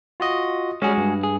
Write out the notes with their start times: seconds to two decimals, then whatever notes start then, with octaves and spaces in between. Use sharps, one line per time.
0.20 F4 F#4 D#5
0.82 G3 G#3 C#4 F#4 G#4
0.98 G2
1.23 G#4